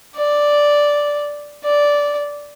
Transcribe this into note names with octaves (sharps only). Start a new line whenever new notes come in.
D5
D5